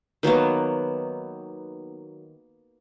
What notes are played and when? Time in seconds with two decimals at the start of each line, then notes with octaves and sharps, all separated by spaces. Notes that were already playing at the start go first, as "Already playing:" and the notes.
0.23 D#3 F#3 A#3 B3